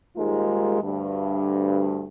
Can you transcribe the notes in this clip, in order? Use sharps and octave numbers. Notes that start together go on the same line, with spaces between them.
D#2 G#2 G3 G#3 F4 A#4
D2 G2